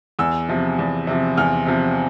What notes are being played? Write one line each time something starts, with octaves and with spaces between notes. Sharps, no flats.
E2 E6
C3 F3
E2
C3 F3
E2 F6
C3 F3